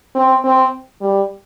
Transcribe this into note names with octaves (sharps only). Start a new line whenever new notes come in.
C4
C4
G3